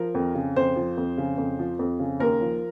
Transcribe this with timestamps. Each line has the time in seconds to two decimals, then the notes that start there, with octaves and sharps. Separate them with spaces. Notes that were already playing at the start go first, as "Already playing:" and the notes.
Already playing: F3 A#4
0.15 F2
0.35 C#3
0.56 F2 C5
0.76 F3
0.98 F2
1.18 C#3
1.38 F2
1.59 F3
1.79 F2
1.99 C#3
2.19 D#2 A#4
2.41 F3